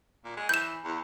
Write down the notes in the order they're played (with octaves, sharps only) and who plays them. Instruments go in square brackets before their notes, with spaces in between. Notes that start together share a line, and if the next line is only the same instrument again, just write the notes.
[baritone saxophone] A#2
G#3
[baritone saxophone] E3 [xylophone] G6 E7
[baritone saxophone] E2